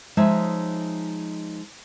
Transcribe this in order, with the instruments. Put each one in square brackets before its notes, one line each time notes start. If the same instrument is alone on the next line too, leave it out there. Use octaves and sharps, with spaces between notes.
[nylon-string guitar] F3 G#3 D#4 C#5 E5